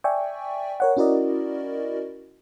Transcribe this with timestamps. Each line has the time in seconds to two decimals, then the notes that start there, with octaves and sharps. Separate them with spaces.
0.04 D5 E5 G5 G#5 C#6
0.80 A#4 C#5 F#5
0.97 C#4 E4 F#4 A#4 D5 D#5